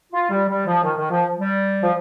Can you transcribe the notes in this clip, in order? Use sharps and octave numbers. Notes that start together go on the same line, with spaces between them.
F4
G3
G3
F3
D#3
D#3
F3
G3
F3